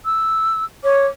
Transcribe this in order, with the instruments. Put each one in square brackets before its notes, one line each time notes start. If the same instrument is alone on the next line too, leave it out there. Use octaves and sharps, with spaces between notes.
[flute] E6
[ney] C#5 [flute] D6